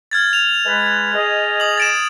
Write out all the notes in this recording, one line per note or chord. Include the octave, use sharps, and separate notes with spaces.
F6 G#6 A6
F7
G#3 B4
G#4 D#5
D#6 F#7
A6 D7 E7